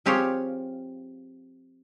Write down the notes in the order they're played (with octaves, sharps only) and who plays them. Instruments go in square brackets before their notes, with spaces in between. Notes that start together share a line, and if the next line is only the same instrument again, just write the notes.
[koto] F3 C4 G4 G#4 C#5 F5